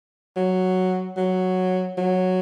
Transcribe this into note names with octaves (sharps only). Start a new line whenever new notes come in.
F#3
F#3
F#3